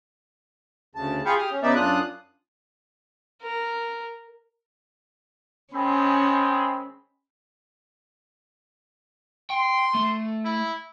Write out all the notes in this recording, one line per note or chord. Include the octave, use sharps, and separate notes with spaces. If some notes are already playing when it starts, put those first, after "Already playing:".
D2 C#3 A5
F4 G#4 F5 G5 B5 C#6
G4 D#6 F6
C#4
C#3 B3 D#4 D5 E5
F#2 D4 F4 D#6 F#6
A#4
D#3 G#3 C4 C#4 B5
G5 C6
A3
E4